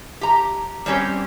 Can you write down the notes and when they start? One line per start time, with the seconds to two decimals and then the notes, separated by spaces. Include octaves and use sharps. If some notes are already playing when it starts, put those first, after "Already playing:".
0.21 G4 A#5
0.86 G3 C4 C#4 G4